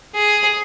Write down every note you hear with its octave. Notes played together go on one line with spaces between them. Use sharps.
G#4